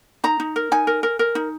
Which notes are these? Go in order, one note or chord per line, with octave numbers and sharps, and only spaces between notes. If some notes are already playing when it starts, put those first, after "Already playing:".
D#4 A#5
D#4
A#4
D#4 G#5
A#4
A#4
A#4
D#4